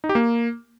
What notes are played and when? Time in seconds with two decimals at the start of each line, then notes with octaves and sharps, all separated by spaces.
0.04 D#4
0.09 G4
0.15 A#3